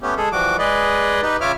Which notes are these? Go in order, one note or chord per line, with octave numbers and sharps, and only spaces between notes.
A3 B3 C#4 G4
G#3 G#4 A4
E3 F3 G3 F#4 D6
G#3 G#4 B4 D5 D#5
D#4 G4 B4
C#3 F4 C#5 E5 D6 F6